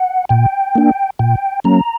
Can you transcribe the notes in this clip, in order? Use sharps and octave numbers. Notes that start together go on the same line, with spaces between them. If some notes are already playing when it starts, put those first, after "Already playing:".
Already playing: F#5
A#2 G5
A#3 D4
A#2 G5
F#3 A#3 C#4 A#5